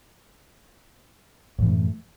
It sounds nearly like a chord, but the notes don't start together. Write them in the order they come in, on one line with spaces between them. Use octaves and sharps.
A2 E3 F#2 A3